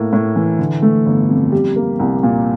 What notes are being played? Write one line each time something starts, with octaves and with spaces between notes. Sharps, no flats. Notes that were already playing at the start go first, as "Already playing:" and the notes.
Already playing: A2 A#3
A2
E3
D3
A3
G1
F2
G3
A#3
C2
A#2